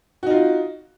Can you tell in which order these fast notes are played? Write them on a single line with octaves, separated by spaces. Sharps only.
F#4 D#4 F4